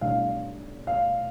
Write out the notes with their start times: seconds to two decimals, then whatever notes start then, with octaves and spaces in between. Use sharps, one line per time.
0.01 B1 A2 G3 D4 F5
0.87 F5